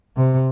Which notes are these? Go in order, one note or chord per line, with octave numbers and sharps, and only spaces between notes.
C3